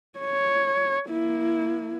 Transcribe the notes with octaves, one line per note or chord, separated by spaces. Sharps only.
C#5
A#3 E4